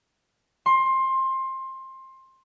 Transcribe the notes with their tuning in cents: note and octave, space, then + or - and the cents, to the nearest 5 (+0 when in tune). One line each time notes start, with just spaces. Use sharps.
C6 +20